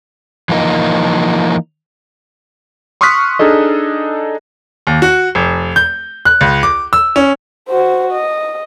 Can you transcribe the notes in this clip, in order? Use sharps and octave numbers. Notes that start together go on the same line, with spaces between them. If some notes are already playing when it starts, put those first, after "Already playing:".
E3 F3 A#3 D#4
C6 C#6 D#6 F6 F#6 B6
D4 D#4 G#4 A4 D#5
D#2
F#4
F1
G6
F#6
C#2
D6
E6
C#4
F#4 C5
D#5